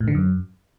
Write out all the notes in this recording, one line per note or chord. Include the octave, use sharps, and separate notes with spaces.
A2
D3
F#2